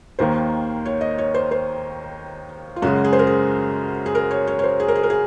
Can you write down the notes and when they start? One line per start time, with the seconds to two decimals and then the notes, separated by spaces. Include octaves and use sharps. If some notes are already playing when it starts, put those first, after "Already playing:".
0.19 D#2 D#3 A#3 C5
0.86 C#5
1.01 D#5
1.18 C#5
1.34 C5
1.51 C5
2.76 F4
2.82 F#2 C#3 G#3 F#4
3.04 G#4
3.13 C5
3.19 A#4
3.27 G#4
4.06 G#4
4.15 A#4
4.31 C#5
4.47 C#5
4.59 C#5
4.64 C5
4.80 G#4
4.88 A#4
4.95 G#4
5.03 A#4
5.10 G#4